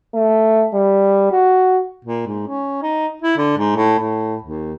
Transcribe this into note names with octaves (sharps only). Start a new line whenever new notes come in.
A3
G3
F#4
A#2
G#2
C#4
D#4
E4
D3
G#2
A2
A2
D#2